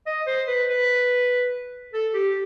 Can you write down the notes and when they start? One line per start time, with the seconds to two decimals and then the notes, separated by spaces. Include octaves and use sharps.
0.06 D#5
0.27 C5
0.47 B4
0.68 B4
1.93 A4
2.14 G4